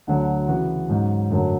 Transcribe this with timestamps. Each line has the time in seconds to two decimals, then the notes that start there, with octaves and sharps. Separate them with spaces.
0.07 D2 D3 F#3
0.48 C#3 E3 B3 F#4
0.89 G#2 F#3 C#4
1.30 F#2 D3 F#3 A3